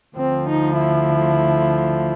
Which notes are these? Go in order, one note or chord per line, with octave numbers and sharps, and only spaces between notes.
D2 D3 F3 C4
D#4
E4